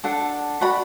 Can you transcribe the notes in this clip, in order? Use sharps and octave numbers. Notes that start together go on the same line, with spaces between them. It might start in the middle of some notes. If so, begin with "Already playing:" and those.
D4 A4 F#5
F#4 D5 F#5 B5